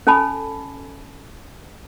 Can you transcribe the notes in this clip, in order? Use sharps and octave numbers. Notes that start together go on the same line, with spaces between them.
C#4 A4 G#5 A5 B5